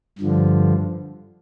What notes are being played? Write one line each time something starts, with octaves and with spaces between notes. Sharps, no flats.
G2 D3 F3